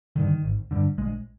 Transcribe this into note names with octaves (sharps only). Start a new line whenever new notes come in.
G2 D3 D#3
G#1
G2 D3
A#1 G#3